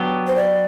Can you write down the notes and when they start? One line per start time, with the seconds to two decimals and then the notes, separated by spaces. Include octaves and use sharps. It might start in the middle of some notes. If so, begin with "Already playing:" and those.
Already playing: F#3 B3 D4 G4
0.27 C5
0.36 D5